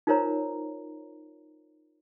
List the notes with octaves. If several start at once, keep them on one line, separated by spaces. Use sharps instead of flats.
D#4 F4 A#4 C5 C#5 A#5